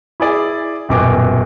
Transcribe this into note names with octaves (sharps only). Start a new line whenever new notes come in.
E4 G#4 D5
D#1 F#2 B2 D6